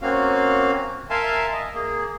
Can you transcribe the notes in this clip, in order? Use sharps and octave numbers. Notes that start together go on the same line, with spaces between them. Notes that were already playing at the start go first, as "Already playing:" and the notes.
A#3 C4 C#4 F#4 F5
A#4 E5 F5 G#5 A5 C6
D#5
A#3 G#4